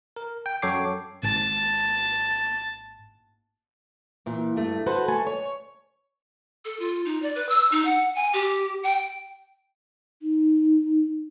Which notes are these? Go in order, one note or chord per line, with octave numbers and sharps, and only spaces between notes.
A#4
G5
F#2 A4 C#5 G5 D6 C7
G#1 A5
A#2 E3
G2 A3
F#4 A4 B4 C5
A3 A4 G#5
C#5
A4
F4
D#4
D5
B4
E6
D#4
F#5
G#5
G4
G5
D#4